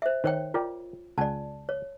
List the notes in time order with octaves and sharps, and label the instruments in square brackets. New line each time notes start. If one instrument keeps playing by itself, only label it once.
[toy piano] C5 E5
[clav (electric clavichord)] D#3 [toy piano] C5 C#5 G5
[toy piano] F4 [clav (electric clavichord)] A#4 D5 G5
[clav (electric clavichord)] C#2 F#5 G#5 [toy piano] D5 A5
[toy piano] C#5